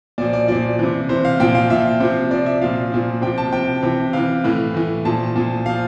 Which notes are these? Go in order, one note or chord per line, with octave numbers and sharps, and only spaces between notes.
A#2 F3 D5
D5
A#2 F3 D5
C3 E3
C3 E3 C5
F5
A#2 F3 G5
F5
A#2 F3 E5
C3 F3
C3 F3 D5
E5
A#2 F3 F5
A#2 F3
C3 F3 G5
A5
C3 F3 G5
C3 E3
C3 E3 F5
A2 E3
A2 E3
A#2 F3 A5
A#2 F3
A#2 F3 F5